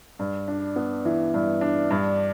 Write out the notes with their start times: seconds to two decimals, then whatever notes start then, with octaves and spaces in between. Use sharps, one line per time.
0.19 G2
0.48 D4
0.76 B3
1.05 E3
1.34 G2
1.61 D4
1.90 G2